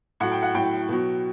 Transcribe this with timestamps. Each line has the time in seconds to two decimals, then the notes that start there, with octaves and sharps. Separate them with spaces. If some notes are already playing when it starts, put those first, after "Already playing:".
0.20 A2 F#3 F#5
0.32 G5
0.42 F#5
0.54 A2 F#3 G5
0.88 B2 F#3